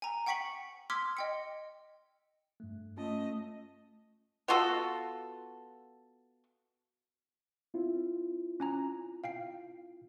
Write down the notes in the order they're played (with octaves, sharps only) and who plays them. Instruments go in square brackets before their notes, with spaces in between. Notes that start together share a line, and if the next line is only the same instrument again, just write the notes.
[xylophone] G#5 A#5
F#5 G5 C#6 B6 C#7 F#7
C6 D6 E6 F6 G#6 B6
D#5 G5 C#7
[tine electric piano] G2 A3
[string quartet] A3 D#5 [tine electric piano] C#4 F4 A5
[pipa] B3 F4 F#4 A4
[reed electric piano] C4 E4 F4
[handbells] C#4 G#5 A#5
F5 G5 C7